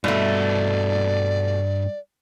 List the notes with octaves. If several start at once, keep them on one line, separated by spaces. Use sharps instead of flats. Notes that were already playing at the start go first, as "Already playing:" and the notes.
G2 B2 A3 D5 D#5